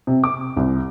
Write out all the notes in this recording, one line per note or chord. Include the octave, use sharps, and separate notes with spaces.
C3
D6
C2